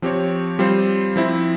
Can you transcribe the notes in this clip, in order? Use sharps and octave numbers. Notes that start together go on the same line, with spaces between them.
F3 C4 G4 C#5
G3 C4 F4 C5
F3 C4 E4